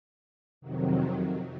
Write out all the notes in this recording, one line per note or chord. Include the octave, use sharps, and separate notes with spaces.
F2 C3 D#3 F#3